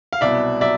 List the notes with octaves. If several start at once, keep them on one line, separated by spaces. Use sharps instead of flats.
F5
C2 B2 F#3 D5 E5
F#3 D5 E5